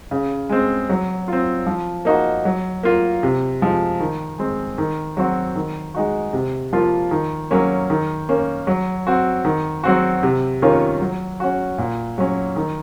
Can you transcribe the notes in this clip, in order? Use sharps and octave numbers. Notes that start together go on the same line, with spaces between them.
C#3
G#3 C4
F#3
C4 F4
F3
A#3 D#4 F#4
F#3
A#3 F4
C3
F3 G#3
D#3
G#3 C4
D#3
F#3 C4 F#4
D#3
G#3 D#4 F#4
C3
F3 A#3 F4
D#3
F#3 A#3 C#4
D#3
A#3 C#4
F#3
C4 F#4
D#3
F#3 C4 F#4
C3
D#3 A#3 C#4 F4
F#3
C#4 F#4
A#2
F#3 C#4
D#3